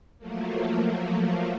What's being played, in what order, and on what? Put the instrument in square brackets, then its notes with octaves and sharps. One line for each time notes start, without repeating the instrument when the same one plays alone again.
[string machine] F3 F#3 A3 A#3